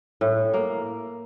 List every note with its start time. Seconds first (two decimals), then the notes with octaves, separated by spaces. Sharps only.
0.21 A2
0.54 A#3